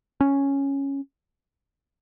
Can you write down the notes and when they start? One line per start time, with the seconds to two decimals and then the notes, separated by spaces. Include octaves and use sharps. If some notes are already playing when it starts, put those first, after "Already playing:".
0.21 C#4